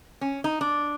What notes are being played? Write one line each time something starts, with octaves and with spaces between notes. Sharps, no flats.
C#4
D#4
D4